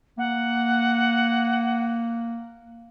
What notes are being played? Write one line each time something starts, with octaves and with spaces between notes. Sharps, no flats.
A#3 F#5